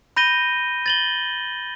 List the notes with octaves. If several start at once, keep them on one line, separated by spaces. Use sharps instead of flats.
B5 G6 A#6 D#7 G7
A6 F#7 G7